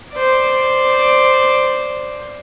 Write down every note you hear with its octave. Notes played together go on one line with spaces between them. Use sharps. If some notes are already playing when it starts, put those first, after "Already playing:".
C5 D5